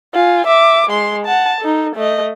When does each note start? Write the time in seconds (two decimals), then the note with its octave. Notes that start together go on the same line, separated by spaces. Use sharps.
0.14 F4 G#5
0.47 E5 D6
0.90 G#3 C6
1.25 F#5 A5
1.61 D#4 A4
1.95 A3 D#5